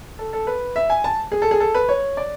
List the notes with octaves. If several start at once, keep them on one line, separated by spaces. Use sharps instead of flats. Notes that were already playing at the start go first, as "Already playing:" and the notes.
A4
A4
B4
E5
G#5
A5
G#4
A4
G#4
A4
B4
C#5
D5